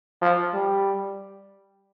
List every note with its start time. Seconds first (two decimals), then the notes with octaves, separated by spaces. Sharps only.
0.21 F3
0.54 G3